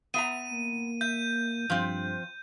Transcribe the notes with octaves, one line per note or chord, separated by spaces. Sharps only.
B3 E5 A#5 D#7
A#3
E5 G6
G2 F3 C4